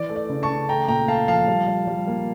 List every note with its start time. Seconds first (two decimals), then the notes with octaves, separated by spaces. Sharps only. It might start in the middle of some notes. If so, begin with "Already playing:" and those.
Already playing: E3 D5
0.09 A3
0.16 D5
0.29 C#3
0.43 A5 C#6
0.49 C#3
0.69 A3 G5 A#5
0.88 A#2 G5 A#5
1.08 A3 F5 A5
1.28 F3 F5 A5
1.48 G3
1.68 G3
1.87 G3
2.07 A#3